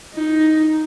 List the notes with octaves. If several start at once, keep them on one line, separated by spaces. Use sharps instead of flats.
D#4